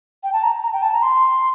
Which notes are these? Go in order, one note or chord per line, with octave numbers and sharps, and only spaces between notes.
G5
A5
A#5
A#5
G5
A5
A#5
C6